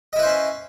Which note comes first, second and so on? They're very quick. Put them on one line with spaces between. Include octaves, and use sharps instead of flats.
D#5 E4 B4 C5 C#4